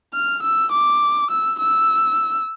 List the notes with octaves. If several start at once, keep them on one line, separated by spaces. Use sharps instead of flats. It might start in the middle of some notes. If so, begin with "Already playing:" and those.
F6
E6
D6
E6
E6